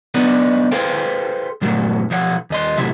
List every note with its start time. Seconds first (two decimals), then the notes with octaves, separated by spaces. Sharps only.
0.14 F#3 B3 D4 D#4 D5 D#5
0.72 G#4 A4 B4 C5 F5 G5
1.61 G2 A#2 F#3 A3
2.10 B1 F3 C#5 F#5
2.50 D#2 D#5 C6
2.78 A2 C3 F#3 E5